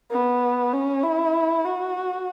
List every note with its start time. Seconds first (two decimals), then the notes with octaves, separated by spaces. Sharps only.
0.11 B3
0.73 C#4
1.03 E4
1.65 F#4